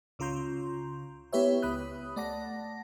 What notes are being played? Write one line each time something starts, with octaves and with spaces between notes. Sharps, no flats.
C#2 C#3 F4 A#5 C6 G6
B3 E4 G4 B4 C#5 E5
C#2 B5 D#6 F#6
A3 D5 F#5 A5 A#6